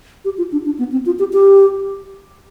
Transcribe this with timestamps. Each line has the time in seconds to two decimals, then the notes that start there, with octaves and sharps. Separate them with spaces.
0.25 G4
0.38 F4
0.52 D4
0.65 D4
0.79 B3
0.92 C4
1.06 F4
1.19 G4
1.33 G4